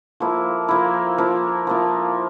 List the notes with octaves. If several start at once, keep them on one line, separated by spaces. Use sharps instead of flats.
F3 A#3 E4
F3 A#3 E4
F3 A#3 E4
F3 A#3 E4